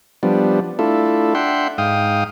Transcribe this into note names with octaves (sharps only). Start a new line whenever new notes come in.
F3 G3 B3 D4
A3 D4 E4 F4 A4
D4 E5 F#5 G5 C6
G#2 F5 G5 D#6